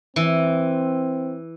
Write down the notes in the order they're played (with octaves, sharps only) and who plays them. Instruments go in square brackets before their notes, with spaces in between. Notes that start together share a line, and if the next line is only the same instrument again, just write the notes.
[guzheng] E3 [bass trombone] C4